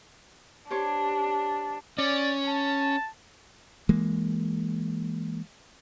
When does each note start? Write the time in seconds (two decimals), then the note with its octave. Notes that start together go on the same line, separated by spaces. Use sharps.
0.70 D4 G4 C5 C#5
1.98 C#4 D5
2.45 A5
3.89 E3 G#3 A#3